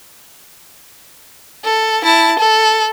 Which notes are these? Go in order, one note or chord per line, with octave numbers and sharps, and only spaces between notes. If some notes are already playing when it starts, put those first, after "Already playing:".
A4
E4 A5
A4